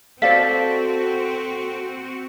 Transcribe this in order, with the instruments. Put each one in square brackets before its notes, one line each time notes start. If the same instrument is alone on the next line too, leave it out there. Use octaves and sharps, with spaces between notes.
[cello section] C4 F#4 [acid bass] A4 [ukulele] C5 D5 F5 [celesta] B6